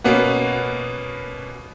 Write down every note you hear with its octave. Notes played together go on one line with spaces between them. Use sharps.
B2 A#3 B3 C#4 F#4